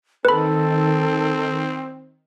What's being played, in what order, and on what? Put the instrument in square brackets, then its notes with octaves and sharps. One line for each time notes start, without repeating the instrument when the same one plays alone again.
[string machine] D#3 [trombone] C4 [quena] A4 [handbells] B4 B5